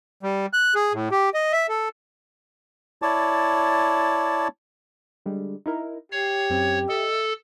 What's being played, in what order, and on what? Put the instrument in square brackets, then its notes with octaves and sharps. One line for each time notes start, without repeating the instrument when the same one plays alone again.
[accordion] G3
F#6
G#4
A2
G4
D#5
E5
A4
[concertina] E4 C#5 D5 A5
[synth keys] D3 G3 G#3
D#4 E4 A#4
[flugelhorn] G4 [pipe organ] C#5 [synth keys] C7
[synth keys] F#2 C4
[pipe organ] A4 [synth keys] D#5 E5